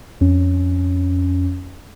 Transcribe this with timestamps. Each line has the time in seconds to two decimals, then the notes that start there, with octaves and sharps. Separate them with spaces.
0.21 F2 C#4